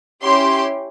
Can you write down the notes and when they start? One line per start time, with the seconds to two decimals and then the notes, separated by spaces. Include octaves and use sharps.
0.23 C#4 E4 G4 C6